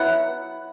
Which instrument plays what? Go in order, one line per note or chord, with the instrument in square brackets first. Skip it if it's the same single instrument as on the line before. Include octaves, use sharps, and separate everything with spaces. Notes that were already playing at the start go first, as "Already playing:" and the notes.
Already playing: [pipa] F#3 B3 E4 F#5